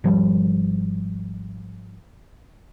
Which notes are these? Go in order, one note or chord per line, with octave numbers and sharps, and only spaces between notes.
G#1 F3 G3